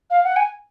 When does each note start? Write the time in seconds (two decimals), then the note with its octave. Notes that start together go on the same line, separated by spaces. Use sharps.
0.10 F5
0.24 F#5
0.36 G#5